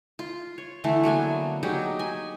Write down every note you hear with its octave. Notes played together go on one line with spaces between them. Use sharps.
F4
C#5
D3 E3 A3
F#3 A#3 B3 G#5
F#3 D#4 G4 G#4
G#5